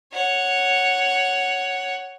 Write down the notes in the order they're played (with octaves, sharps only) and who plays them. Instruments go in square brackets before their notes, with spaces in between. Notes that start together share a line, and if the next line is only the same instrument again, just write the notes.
[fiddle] C#5 F#5